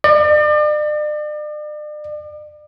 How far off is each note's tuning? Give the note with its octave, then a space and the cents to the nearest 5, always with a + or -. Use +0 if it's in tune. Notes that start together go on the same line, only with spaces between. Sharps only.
D5 +40